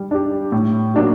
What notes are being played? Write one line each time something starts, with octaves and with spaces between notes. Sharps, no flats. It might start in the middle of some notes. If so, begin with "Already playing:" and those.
Already playing: G3
D4 G4
A2
F#3 A#3 D4 F#4